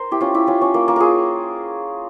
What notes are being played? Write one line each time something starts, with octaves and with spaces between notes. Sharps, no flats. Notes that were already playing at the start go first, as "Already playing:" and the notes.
Already playing: A#4 C5
E4 G4
C#4 F4
E4 G4
C#4 F4
C#4
A#3
A#3
F4 G#4 A#4